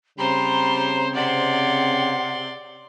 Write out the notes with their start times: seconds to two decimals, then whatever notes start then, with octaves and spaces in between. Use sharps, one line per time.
0.19 C#3 G3 C4 C5 A#5 C6
1.15 C3 D5 F#5 C6